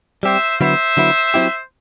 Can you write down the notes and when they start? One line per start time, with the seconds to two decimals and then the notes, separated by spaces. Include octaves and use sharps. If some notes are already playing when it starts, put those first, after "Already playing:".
0.23 G3 C4 G4 C5 E5
0.61 D3 F#3 B3 E4 C5 E5
0.97 D3 F#3 B3 E4
1.34 F#3 C4 E4 G4